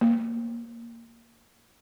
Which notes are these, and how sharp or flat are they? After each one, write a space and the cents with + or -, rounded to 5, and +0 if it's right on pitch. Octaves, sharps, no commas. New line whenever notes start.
A#3 -5